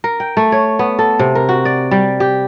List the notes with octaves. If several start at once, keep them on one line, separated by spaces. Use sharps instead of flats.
A#4
G5
A3
C#5
B3
A4
C3
A#4
F#4
D5
G3
G4